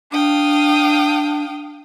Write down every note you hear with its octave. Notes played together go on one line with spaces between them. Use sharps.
D4 F5 G5 D#6